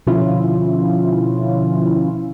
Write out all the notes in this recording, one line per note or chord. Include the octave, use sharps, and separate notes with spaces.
B2 D3 F3 C#4 E4 F4